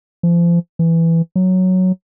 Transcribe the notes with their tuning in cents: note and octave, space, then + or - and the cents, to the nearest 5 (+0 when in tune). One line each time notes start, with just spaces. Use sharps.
F3 -35
E3 +5
F#3 +0